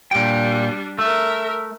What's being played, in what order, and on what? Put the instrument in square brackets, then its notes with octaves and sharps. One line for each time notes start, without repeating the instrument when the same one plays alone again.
[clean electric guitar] A#2 G5 [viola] G3 D4
[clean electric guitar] A3 [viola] A#4 E5